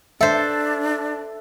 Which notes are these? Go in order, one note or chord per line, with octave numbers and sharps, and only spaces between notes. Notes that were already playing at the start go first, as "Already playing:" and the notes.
D4 A4 C5 E5